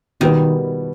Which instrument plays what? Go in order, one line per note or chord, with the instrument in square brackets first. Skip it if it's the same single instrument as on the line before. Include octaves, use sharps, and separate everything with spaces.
[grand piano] B2 G3 B3 [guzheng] D#3